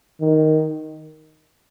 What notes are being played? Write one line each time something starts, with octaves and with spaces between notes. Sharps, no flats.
D#3